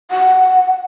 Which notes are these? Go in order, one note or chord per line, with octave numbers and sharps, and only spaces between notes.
F#5